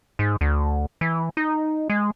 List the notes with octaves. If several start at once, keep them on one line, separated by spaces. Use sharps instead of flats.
G#2
D2
E3
D#4
G#3